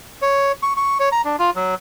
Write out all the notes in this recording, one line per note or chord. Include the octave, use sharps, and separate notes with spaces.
C#5
C#6
C#6
C#5
A#5
D4
F4
F#3